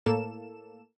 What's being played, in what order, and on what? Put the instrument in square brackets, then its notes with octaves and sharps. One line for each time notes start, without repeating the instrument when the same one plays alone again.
[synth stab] A2 A#3 A4 E7